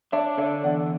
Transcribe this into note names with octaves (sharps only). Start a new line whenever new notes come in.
D4 C#5 E5
D3 C#5 E5
E2 D5 F#5